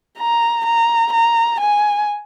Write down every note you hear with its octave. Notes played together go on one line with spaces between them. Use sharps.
A#5
A#5
A#5
G#5